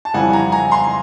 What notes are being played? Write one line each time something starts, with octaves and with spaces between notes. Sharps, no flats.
A5
F2 C#3 E3 G3 F#5 G#5
G#5 A#5
G#5 A#5
A#5 C6